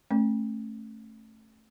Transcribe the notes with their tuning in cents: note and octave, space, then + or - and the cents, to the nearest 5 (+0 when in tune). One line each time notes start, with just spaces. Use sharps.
A3 +0 C#4 -30